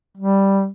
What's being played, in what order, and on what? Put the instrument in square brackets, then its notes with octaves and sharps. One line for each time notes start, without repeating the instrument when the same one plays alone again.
[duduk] G3